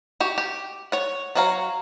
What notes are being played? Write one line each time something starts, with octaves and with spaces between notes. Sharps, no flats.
F#4 G4
G4
C#5 F#5
F#3 F#4 C#5 F5 A#5